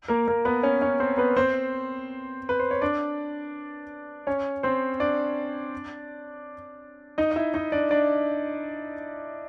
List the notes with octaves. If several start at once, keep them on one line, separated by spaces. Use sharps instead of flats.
A#3 A#4
A#3 A#4
B3 B4
C#4 C#5
C#4 C#5
C4 C5
B3 B4
C4 C5
B4
C5
C#5
D4 D5
C#4 C#5
C4 C5
D4 D5
D#4 D#5
D#5
E4 E5
D#4 D#5
D4 D5
D4 D5